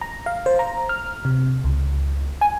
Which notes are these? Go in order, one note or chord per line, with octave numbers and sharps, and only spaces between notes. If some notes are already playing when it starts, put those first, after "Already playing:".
A#5
F5
C5
A#5
F6
C3
C#2
G#5